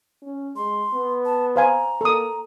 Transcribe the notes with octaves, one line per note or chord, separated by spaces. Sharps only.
C#4
G#3 C6
B3
A5
C5 F5 G#5 A#5
A#3 A4 D#6